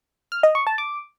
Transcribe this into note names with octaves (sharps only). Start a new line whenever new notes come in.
F6
D#5
C#6
A5
D6